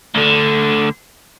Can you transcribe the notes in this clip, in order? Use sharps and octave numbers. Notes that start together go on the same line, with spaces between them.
D2 D3